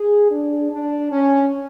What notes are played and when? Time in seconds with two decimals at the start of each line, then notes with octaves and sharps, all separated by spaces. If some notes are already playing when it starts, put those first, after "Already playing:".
Already playing: G#4
0.30 D4
0.71 D4
1.11 C#4